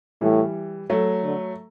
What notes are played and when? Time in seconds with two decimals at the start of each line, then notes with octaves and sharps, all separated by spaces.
0.21 A2 E3 G3
0.90 F#3 A3
1.23 D3